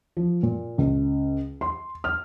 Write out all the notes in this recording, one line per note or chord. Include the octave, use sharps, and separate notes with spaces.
F3
A#2
C#2
C6
F6